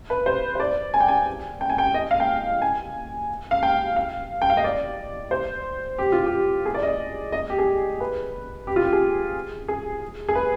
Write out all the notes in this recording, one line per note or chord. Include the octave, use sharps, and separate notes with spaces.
B4
C5
C5
D5
G#5
G5
G#5
G5
G#5
G5
D#5
F5
G5
G#5
F5
G5
F5
G5
F5
D#5
D5
C5
G4
F4
G4
G#4
D5
D#5
D#5
G4
G#4
B4
G4
F4
G4
G#4
G#4
G#4
B4